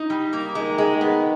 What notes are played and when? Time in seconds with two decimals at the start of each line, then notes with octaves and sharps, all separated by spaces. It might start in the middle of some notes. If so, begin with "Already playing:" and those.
Already playing: D#4
0.10 G3
0.33 A#3
0.55 D#3 G#3
0.78 G#3
1.01 B3